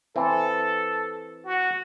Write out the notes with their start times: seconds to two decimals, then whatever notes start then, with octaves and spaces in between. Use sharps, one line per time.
0.16 E3 C4 A4
1.45 F#4